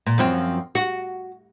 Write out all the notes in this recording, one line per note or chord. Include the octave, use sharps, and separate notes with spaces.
A#2
F#2 F3 C4
F#4